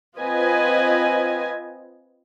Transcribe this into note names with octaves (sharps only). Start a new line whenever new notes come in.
C4 F4 B4 D#5 G#5